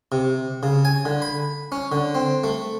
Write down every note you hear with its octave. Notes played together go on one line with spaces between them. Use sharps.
C3
C#3
G#5
D3
B5
C#4
D3
C4
A3